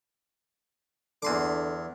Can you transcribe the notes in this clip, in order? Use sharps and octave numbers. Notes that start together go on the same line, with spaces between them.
E2 D3 C6 D6